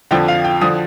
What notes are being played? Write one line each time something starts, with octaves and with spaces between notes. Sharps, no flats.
F2 D3 F3 G5
F5
G5
D3 F3 D#6